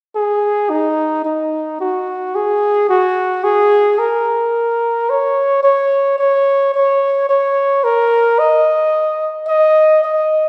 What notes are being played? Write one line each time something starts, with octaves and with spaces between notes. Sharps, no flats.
G#4
D#4
D#4
F#4
G#4
F#4
G#4
A#4
C#5
C#5
C#5
C#5
C#5
A#4
D#5
D#5
D#5